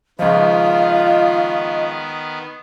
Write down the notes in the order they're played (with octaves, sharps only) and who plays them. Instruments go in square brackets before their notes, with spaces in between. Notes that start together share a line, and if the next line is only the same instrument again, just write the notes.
[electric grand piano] C#2 F3 [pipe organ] D#3 B3 [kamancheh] F4 [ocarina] D#5